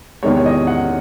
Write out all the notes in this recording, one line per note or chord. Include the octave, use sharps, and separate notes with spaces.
E2 C3 D#3 G#3 C#5
C#5
D#5
F#5